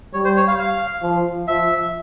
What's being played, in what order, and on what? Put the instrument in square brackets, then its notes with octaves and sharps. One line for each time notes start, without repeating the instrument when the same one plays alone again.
[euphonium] G3 [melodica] C#5
[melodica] C5
C#5
F5
F5
[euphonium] F3
[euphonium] F3 [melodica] E5